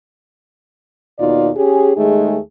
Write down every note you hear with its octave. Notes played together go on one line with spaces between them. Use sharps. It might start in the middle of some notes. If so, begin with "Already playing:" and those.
D#2 B2 D#4 F4 D5
C#4 G4 G#4
D#2 G#3 A3 D#4 G#4